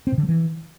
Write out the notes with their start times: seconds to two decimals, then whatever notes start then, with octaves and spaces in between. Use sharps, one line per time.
0.07 C4
0.12 A#2
0.18 D3
0.23 F#3
0.29 E3